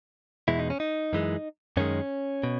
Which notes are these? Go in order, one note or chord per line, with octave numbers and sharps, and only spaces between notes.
E2 B2 G#3 E4
D#4
C#4
D#4
F#2 E3 G#3
F#2 D#3 G#3 C#4
B2